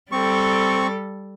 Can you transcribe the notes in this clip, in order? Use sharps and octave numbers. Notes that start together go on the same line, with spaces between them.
G3 C4 A4 C#6